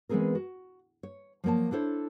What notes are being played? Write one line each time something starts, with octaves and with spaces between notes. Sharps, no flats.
E3 G#3 B3 C4 G#4 A#4
F#4
C#5
F3 F#3 A#3 C#5 A5
D4 E4 A4 C5 C#5